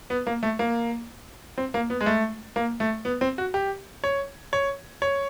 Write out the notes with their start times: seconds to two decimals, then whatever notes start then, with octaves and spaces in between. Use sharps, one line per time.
0.10 B3
0.27 A#3
0.43 A3
0.59 A#3
1.58 C4
1.74 A#3
1.90 B3
2.01 G#3
2.06 A3
2.56 A#3
2.80 A3
3.05 B3
3.21 C4
3.38 F#4
3.54 G4
4.04 C#5
4.53 C#5
5.02 C#5